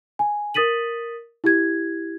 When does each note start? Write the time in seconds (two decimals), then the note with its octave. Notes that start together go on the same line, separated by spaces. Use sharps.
0.19 G#5
0.54 A#4 D#6 A6 B6 D#7 F#7
1.44 E4 G4 G#6